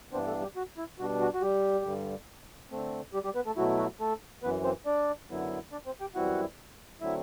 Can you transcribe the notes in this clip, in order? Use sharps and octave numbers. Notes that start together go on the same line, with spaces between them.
G2 E3 B3 C4 D4 C5
A3 A4
G3 G4
F#4
E4
B2 G3 D4 F#4
F#4
F#4
G3 G4
G2 D3 G3
D3 A3 C4
G3 G4
G3 G4
B3 B4
A3 A4
B2 F#3 A3 E4 F#4
F#4
A3 A4
F#2 E3 B3 B4
C4 C5
D4 D5
F#2 D3 F#3 B3 E4
D4 D5
C4 C5
G4 G5
F#2 E3 G3 C4 E4 F#4 F#5
D3 F#3 A3 C4 E4 E5